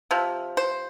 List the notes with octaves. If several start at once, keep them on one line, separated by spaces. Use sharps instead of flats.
C3 F3
C5